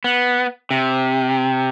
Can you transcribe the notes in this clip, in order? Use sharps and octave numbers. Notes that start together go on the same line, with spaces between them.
B3
C3